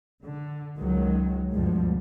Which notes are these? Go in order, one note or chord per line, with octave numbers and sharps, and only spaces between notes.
D3
C#2 D#3 F#3 G#3
D2 G2 B2 F3 G3 G#3